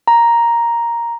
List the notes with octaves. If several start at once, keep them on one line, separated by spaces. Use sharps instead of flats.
A#5